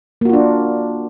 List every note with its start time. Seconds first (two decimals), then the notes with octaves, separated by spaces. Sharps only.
0.21 A#3
0.25 F#4
0.29 F4
0.33 D4